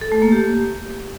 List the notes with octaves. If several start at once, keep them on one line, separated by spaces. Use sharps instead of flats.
A4
A3
A#3
G4